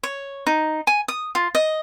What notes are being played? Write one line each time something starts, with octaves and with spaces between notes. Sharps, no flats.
C#5
D#4
G#5
D#6
F4
D#5